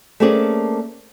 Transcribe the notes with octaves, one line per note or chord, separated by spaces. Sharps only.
A3 A#3 C4 C#4 G#4 D5